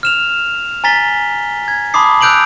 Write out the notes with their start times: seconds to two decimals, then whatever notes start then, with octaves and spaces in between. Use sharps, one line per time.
0.03 F6 E7 F7
0.84 G#5 A#5 A6 B6 G7
1.68 G#6
1.94 A5 B5 C6 D6 D#6 C7
2.21 E6 F#6 G6 D7 F7 F#7